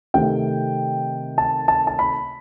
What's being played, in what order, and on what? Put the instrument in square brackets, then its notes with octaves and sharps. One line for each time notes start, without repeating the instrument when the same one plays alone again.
[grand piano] C3 D#3 A3 C4 G5
A5
A5
A5
B5